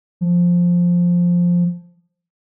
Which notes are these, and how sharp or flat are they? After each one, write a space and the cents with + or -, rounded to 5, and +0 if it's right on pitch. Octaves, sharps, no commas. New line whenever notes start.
F3 +5